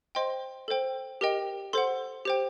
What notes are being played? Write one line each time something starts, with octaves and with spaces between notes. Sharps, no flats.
C5 D#5 G5 C6
A4 C5 G5
G4 A#4 D#5 G5
A4 C5 F#5 C6
G4 C5 G5